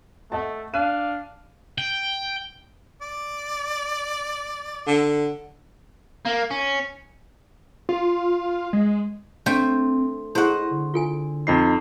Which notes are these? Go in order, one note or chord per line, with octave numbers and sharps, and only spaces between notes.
A3 D#5 F#5 A5
D4 F5 F#6 D#7
G5
D5
D3
A#3
C#4
F4
G#3
A3 C4 D4 C5 G5
E4 G#4 C5 D#5 F#5 C#6
D3
F4 A4 G#5
F2 D#4 B5 C7